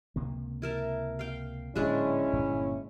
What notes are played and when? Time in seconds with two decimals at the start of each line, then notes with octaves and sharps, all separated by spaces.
0.16 C#2 C3 A#3
0.62 E4 A#4 A5
1.19 F5 G5
1.75 D1 A#2 G#3 C#4 D4 E4 E5
2.33 G1 A#2 A#3